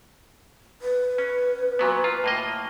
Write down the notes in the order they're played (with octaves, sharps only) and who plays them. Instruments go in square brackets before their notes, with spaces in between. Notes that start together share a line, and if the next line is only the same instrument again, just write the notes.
[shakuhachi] B4
[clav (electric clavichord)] C#4
A#2 F#3 B3
F4
A2 A#3 D#5